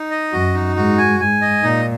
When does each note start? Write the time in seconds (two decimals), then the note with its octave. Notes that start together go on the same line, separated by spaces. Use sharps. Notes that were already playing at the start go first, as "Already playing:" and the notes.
Already playing: D#4
0.11 D#5
0.32 F#2 F#4
0.54 D#4
0.76 G#2 F#4
0.98 G#5
1.19 G#2 G#5
1.41 D#5
1.63 A#2 D#4